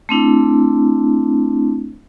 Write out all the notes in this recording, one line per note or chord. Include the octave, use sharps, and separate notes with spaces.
A3 C4 D4 E4